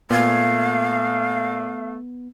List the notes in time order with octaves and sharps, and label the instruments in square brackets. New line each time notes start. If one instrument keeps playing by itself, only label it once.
[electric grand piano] A#2 G#6 [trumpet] A3 [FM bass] B3 [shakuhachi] F5